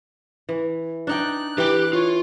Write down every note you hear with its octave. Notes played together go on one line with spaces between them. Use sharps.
E3
D4 D#4 G5 F#6
E3 G4 G5
F4 C#5